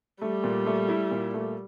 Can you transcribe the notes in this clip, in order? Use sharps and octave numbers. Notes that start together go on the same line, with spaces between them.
G3 A3
A#2
A3
E4
A#2
A3